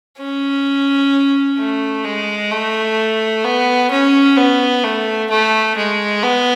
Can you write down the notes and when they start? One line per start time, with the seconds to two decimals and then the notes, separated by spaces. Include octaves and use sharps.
0.18 C#4
1.58 A3
2.04 G#3
2.51 A3
3.44 B3
3.91 C#4
4.37 B3
4.83 A3
5.30 A3
5.77 G#3
6.23 B3